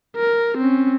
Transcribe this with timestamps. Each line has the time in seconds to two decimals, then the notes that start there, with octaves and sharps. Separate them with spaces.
0.16 A#4
0.58 C4 C#4